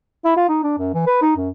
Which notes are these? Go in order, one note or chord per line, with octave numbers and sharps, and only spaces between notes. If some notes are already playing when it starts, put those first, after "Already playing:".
E4
F4
D#4
D4
F#2
E3
B4
D#4
F#2